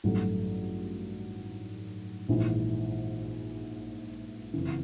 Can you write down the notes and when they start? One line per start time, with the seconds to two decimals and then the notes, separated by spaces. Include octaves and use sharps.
0.04 A1 G2 D#3 F#3 A3
2.29 A#1 G#2 E3
4.54 F#1 F2 C#3 E3